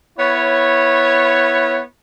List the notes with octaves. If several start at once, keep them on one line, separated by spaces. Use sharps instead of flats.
B3 E4 C#5